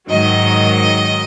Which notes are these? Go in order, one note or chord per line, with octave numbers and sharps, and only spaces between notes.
G#2 D#3 F#3 D#5